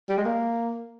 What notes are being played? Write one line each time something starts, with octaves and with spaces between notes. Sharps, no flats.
G3
G#3
A#3